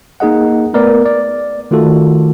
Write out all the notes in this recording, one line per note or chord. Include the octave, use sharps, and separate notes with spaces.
A#3 D#4 G#4 D#5 F#5
A3 B3 A#4 B4 D5
D5
D#3 A3 F4 F#4 A4